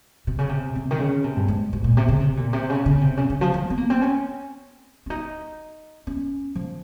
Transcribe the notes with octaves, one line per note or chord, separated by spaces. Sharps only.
C3
C#3
C3
C3
D#3
C#3
C3
G2
G#2
G#2
A#2
C3
C#3
C3
A#2
C3
C#3
C#3
C3
C#3
C#3
F3
F3
C4
A#3
C4
C#4
C#4
D#4
C#4
F3